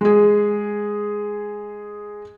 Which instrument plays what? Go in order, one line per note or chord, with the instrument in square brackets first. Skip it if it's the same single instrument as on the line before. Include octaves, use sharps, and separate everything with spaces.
[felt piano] G#3 G#4